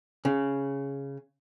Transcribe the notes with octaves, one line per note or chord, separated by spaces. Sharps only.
C#3